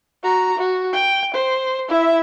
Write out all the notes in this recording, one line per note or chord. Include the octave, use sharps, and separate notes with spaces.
F#4 A#5
F#4
G5
C5
E4 E5